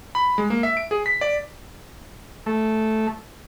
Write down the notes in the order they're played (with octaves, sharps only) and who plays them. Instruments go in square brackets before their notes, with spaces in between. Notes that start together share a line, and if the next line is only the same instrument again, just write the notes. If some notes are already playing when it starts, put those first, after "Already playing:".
[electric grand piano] B5
G#3
A#3
E5
D7
G#4
B6
D5
[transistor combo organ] A3